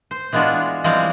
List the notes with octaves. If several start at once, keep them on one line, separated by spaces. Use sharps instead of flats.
C5
E3 G#3 B3 D4 F4 F#4
E3 F3 G3 G#3 C4